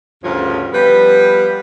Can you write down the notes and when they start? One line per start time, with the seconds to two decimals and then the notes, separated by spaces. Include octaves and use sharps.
0.23 D2 G2 C#3 F3 F4 C#5
0.73 F3 G3 B3 B4